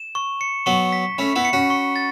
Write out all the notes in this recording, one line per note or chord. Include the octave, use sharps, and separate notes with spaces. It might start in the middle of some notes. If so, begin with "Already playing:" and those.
Already playing: E7
C#6
C#7
F#3 B3 C#6
B6
A3 C#4 B5
B3 E4
C#7
C#4 F#4
C#6
A6